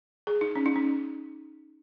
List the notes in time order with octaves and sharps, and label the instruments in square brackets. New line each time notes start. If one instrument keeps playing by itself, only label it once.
[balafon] G#4
D#4
C#4
D#4
C#4